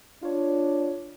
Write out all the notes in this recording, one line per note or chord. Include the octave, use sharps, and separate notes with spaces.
D4 F4 C#5